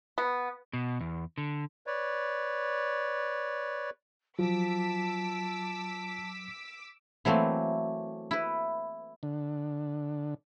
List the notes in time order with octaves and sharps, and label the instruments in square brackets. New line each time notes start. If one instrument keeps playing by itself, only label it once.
[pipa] B3
[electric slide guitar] B2
E2
D3
[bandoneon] B4 C#5 D5
[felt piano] F3 [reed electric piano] F#3 [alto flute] A5 [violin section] D6 E6 B6
[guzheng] E3 F#3 A3 A#3 C4
E4 B4
[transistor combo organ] D3